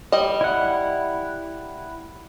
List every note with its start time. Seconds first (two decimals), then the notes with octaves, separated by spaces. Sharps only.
0.12 G3 D#5
0.41 E4 F#5